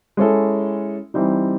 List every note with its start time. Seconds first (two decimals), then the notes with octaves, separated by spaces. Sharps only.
0.17 G#3 C#4 E4 A4
1.14 E3 G3 C4 D#4